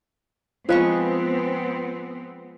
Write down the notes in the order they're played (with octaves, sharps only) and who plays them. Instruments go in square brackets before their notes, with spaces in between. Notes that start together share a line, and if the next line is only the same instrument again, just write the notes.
[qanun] F3 G#3 C#6 [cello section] B3 C4 [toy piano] F4 C5 F5